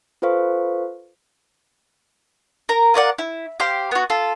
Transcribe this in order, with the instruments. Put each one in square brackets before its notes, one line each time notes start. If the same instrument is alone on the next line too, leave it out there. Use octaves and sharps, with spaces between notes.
[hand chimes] F4 A4 B4 C5 F5 C#6
[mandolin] A#4 A#5
F4 A#4 D5 F#5
E4
G4 C5 F5
B3 F#4
F4 A4